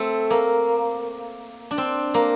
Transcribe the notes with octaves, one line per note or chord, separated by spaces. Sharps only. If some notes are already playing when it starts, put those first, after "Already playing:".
Already playing: A3 C4
A#3
D4
C4
A#3